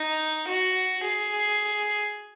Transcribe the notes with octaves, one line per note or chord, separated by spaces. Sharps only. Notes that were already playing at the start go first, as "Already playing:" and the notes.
Already playing: D#4
F#4
G#4